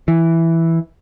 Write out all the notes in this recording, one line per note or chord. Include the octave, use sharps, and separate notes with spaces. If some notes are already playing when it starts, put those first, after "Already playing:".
E3